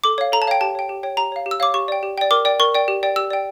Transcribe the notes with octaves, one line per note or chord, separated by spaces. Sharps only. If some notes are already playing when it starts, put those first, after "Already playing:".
A4 D6
C#5 F5
A4 A#5
A5
C#5 F5 G5
G4 A5
C#5 G5
G4
C#5 G5
G4 A#5
C#5 F5
G4
E6
C#5 F5 D6
G4 C#6
D5 G5
G4
D5 G5
A#4 D6
D5 G5
A#4 C#6
D5 G5
G4
D5 G5
G4 E6
D5 G5